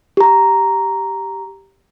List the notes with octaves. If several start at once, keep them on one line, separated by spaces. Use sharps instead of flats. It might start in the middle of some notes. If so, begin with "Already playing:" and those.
G4 A#5